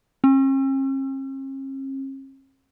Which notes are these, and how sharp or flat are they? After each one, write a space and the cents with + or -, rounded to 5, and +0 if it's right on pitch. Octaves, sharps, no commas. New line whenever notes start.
C#4 -45